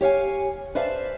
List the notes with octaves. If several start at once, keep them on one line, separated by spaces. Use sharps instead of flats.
G4 C#5 F5 G#5
B4 C5 D5 E5 F5 A5